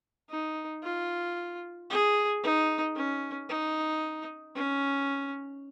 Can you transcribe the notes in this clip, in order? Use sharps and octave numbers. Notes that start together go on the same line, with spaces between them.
D#4
F4
G#4
D#4
C#4
D#4
C#4